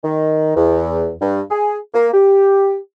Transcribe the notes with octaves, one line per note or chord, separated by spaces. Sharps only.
D#3
E2
G2
G#4
A#3
G4